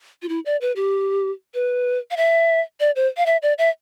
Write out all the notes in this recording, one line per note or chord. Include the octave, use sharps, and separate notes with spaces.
F4
E4
D5
B4
G4
B4
F5
E5
D5
C5
F5
E5
D5
E5